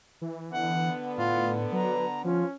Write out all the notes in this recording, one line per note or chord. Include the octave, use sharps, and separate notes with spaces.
E3
D3 B3 F#5
A2 F4
F#3 B4 A#5
F3 C#4 F4